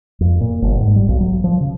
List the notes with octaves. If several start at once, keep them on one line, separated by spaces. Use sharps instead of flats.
F2
A#2
G1
G#2
G3
B1
F#3
F3
C#3